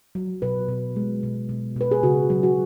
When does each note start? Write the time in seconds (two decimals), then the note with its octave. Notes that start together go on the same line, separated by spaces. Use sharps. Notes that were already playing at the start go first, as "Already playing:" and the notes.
0.15 F#3
0.42 B2 B4
0.69 B2
0.96 G#3
1.23 B2
1.49 B2
1.76 B2 B4
1.91 G#4
2.03 C#3 F#4
2.30 F#3
2.43 F#4